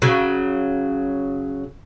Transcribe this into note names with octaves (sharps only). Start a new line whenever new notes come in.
C#3 F#3